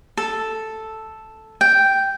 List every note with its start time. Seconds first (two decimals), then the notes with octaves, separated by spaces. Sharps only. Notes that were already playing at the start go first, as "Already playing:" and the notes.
0.17 A4
1.61 G5